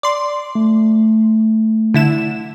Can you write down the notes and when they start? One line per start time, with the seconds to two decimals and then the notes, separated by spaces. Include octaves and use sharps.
0.03 D5 C6
0.55 A3
1.94 D3 E4 E7